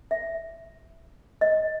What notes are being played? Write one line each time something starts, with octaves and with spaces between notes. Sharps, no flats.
E5
D#5